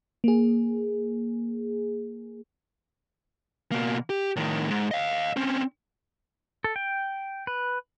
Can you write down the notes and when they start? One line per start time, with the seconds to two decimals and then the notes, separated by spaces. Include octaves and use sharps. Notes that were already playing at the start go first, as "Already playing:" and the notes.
0.24 A#3 G#4
3.72 B2 A#3
4.10 G4
4.36 A2 D#3
4.70 G#2
4.91 D#5 F5
5.37 C4 C#4
6.64 A4
6.76 G5
7.47 B4